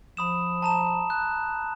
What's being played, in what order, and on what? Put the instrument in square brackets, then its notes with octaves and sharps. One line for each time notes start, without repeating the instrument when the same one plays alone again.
[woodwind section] F3 [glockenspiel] B5 D#6 E7
[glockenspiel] A5 A#5 E7
F#6